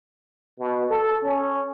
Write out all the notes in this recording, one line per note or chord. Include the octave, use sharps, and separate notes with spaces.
B2
A4
C#4